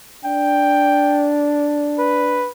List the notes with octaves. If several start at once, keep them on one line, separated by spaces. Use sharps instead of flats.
D4 G5
B4